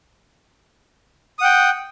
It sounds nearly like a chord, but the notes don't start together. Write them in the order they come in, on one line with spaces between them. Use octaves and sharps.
D#6 F#5 G5